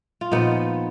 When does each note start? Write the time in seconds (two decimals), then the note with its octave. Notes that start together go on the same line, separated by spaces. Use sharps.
0.21 F4
0.31 A#2 F3 B3 D#4